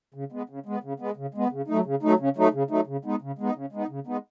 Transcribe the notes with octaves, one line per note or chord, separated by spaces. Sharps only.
C#3
G#3 B3
C#3
G#3 B3
C#3
G#3 B3
C#3
G#3 B3
C#3
F#3 A3 D#4
C#3
F#3 A3 D#4
C#3
F#3 A3 D#4
C#3
F#3 A3 D#4
C#3
G#3 B3 D#4
C#3
G#3 B3 D#4
C#3
G#3 B3 D#4
C#3
G#3 B3 D#4